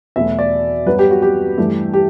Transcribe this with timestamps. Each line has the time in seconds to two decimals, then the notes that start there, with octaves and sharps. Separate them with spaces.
0.16 E2 B2 F#3 A3 E5
0.39 D5
0.86 G2 F#3 B3 B4
0.99 G4
1.11 F#4
1.22 G4
1.58 G2 E3 A3
1.94 G4